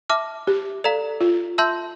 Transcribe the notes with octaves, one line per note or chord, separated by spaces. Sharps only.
E5 A5 D6 F6
G4
A4 D5 F5 A#5
F4
E5 A5 C6 E6 G6